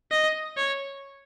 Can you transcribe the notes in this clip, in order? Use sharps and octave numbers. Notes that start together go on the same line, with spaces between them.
D#5
C#5